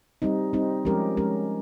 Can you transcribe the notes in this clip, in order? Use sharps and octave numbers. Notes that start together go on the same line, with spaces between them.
G3 C4 D#4
G3 C4 D#4
F3 G#3 C#4 G4 A#4
F3 G#3 C#4 G4 A#4